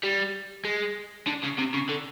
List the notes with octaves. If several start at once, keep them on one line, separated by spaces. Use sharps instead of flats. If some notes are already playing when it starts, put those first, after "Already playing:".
G3
G#3
D3
C#3
C3
C#3
D3